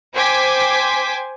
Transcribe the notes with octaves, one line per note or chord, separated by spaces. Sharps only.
C5 G5 G#5 D6 B6